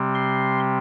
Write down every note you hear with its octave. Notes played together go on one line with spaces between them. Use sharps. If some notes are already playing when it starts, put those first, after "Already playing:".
Already playing: C3 G3 C4
C6